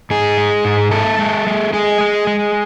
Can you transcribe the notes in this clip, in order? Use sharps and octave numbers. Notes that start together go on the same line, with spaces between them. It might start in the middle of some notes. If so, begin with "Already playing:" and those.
G#2 G#4
G#3
G#2
G#3 A4
G#3
G#3
G#3 G#4
G#3
G#3